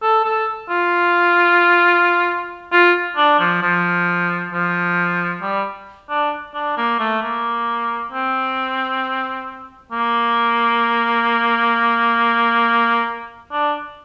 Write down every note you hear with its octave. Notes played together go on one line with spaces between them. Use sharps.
A4
A4
F4
F4
D4
F3
F3
F3
G3
D4
D4
A#3
A3
A#3
C4
A#3
D4